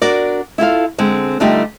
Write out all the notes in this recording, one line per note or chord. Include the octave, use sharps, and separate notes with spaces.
D4 F#4 A#4 D5
E4 F4 A4 F5
D3 G#3 C4
D3 G3 A3 D#4 F4 G4